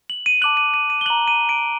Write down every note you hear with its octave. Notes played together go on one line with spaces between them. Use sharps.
F#7
D#7
A5 D6 F#6 F#7
D#7
D#7
D#7
G7
A#5 F#6 F#7
D#7
D7